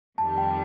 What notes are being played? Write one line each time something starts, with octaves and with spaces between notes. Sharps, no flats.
F2 D#3 G3 A5
G5